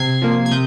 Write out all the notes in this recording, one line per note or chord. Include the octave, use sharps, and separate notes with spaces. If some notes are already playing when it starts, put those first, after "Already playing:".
Already playing: C3 G#6 C7
F3 A#3
G#6
C3 D#6 G6